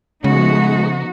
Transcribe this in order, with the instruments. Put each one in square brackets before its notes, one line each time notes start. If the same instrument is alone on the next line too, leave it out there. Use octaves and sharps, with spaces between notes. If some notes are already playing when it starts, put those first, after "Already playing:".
[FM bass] C#3 [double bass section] F3 A3 [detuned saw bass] G#3 [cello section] B3 D#4 F#4